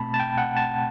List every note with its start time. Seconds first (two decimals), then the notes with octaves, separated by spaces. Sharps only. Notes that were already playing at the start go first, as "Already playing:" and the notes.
Already playing: B2 A3 C4 A5 B5
0.14 A5
0.20 G5
0.38 F#5
0.56 A5